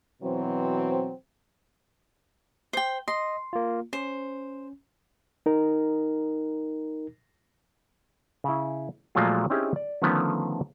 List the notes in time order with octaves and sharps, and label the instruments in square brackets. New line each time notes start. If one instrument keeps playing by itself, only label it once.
[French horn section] B2 E3 F#3 C4
[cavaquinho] C5 G5
[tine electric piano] D#5 [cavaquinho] C6
[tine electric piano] A#3 F4
[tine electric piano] C#4 [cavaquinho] C5
[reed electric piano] D#4 A#4
[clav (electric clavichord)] C#3 E4
A#2 F3 F#3 G#3 A3 F4
C4 C#4 D#4 E4 G4 G#4
D5
D3 D#3 F3 A3 B3 C#4